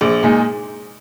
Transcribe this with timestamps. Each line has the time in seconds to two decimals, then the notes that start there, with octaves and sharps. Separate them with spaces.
0.01 A#1 G#4
0.23 A#2 G#3 D#4